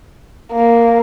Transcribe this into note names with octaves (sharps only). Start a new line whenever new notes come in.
A#3